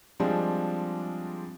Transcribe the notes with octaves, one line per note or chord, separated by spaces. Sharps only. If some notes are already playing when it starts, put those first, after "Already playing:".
F3 G3 G#3 C4 D4